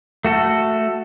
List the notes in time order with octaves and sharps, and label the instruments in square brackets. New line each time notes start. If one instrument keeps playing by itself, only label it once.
[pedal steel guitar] A3 F#4 A4